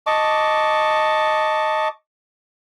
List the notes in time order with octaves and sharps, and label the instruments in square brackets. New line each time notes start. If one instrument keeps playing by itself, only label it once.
[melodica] D#5 A5 C#6 D6